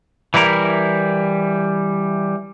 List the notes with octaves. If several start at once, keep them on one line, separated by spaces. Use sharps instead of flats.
E3 G3 E4 A#4